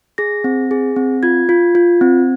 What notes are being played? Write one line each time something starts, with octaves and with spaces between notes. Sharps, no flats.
G#4 A#6
C4
G#4
C4
F4 G#6
F4
F4
C4